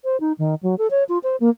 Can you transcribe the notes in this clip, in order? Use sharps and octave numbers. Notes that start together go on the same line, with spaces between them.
C5
D#4
D#3
F#3
A4
C#5
F4
C5
A#3